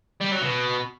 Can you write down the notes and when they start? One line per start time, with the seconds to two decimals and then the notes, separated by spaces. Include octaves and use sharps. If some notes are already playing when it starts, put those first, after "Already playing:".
0.21 G3
0.31 F#3
0.42 B2